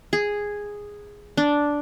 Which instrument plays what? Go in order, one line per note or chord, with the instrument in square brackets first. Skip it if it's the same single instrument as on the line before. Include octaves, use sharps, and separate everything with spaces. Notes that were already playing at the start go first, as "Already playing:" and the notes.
[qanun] G#4
D4